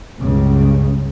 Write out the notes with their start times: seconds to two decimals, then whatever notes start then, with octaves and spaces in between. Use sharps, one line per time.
0.19 C#2 G2 C#3